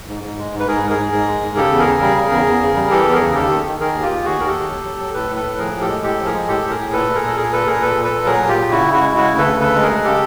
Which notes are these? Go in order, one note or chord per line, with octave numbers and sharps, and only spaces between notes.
G#2
G#2
G#3
G#2
B4
G#2 G#4 A#4
G#2
G#4 A#4
G#2
G#2
G#3
G#2
C#3 G4 A4
E2
G#4 A#4
C#3
G3
C#3
E2
E2
C#3
G3
E3 G4 A4
E2
G#4 A#4
C#3
G#4
D#2 G4 A4
D#3
D#3
D#3 G#4 A#4
D#2
F4 G4
D#2
D#2 F#4 G#4
D#2 A#4
G4 A4
D#2
F#3
F#3
F#3
A2 A4 B4
A2
A4 B4
A2
F3 G#4 A#4
A2
G4 A4
G#3
A2 G4 A4
F3
G#4 A#4
G#3
A2 G4 A4
A2
G#4 A#4
A2
A#2 A4 B4
A#2
G#4 A#4
A#2 A4
A#2 G#4 A#4
A#2 A4 B4
A#2 G#4 A#4
A#2 A4 B4
A#2
A4 B4
A#2
F#3 G#4 A#4
A#2
F4 G4
A#2
C#3 E4 F#4
C#3
E4 F#4
G#3
C#3 E4 F#4
D2
A4 B4
C#3
D2 A4 B4
G#3
G#4 A#4
G#3
C#3 G4 A4